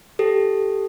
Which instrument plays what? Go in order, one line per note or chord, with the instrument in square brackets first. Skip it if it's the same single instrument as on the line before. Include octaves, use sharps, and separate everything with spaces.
[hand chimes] G4 A4